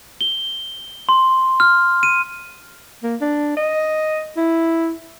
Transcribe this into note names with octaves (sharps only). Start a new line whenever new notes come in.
G7
C6
F6
D#7
A#3
D4
D#5
E4